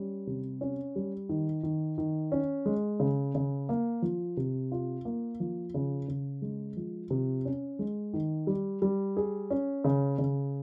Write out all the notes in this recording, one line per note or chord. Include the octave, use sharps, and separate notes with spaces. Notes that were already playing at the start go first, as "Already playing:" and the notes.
Already playing: G3 C#4
C3
C#4
G3
D#3
D#3
D#3
C#4
G#3
C#3
C#3
A#3
F3
C3
F4
A#3
F3
C#3
C#3
G#3
F3
C3
C#4
G#3
D#3
G3
G3
G#4
C#4
C#3
C#3